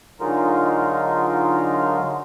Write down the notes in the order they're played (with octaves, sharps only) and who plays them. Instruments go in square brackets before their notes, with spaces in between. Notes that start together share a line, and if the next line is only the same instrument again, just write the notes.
[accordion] D3 F#3 G#3 D#4 F4 A#4